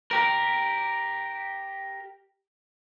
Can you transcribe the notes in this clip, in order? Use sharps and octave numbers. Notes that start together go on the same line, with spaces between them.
G4 A#4